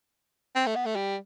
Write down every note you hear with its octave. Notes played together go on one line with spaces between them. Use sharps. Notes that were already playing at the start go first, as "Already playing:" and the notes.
C4
A3
B3
A3
G3